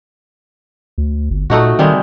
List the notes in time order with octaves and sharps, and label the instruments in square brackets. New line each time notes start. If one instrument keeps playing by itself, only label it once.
[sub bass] D2
G1
[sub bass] A#2 [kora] A3 D#4 F#4
[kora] C3 G3 G#3 [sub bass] D#3